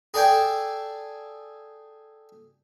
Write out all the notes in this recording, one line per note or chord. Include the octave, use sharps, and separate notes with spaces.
G#4 A4 D5 G5 G#5